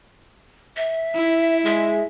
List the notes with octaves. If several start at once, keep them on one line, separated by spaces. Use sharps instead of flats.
E5
E4
G#3 E5